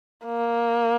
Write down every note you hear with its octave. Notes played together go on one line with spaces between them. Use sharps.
A#3